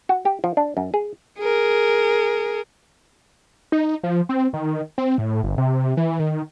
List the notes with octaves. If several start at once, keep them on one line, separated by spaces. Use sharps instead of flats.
F#4
G4
F3
D4
F#2
G#4
G#4 A#4
D#4
F3
C4
D#3
C4
A2
G1
C3
E3
D#3